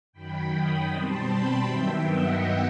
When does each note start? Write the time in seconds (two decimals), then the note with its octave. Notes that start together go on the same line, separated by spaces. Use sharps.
0.12 F#2 D#3 F#3 G5 B5
0.51 B5 D#6
0.89 B2 G3 C4 A5 C6
1.27 G5 B5
1.64 G2 D#3 F#3 B3 E5 G5
2.02 D#5 F#5